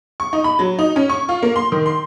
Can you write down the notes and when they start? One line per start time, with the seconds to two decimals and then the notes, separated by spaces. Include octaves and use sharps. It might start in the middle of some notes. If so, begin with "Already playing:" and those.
0.20 C#6
0.33 D#4
0.44 B5
0.59 F#3
0.79 D#4
0.96 C#4
1.10 C#6
1.29 F4
1.43 A#3
1.56 C6
1.72 D#3
1.86 C6